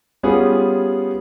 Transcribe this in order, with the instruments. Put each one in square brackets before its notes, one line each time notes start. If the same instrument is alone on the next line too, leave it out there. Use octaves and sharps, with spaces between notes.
[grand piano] G3 B3 C#4 F4 G4 G#4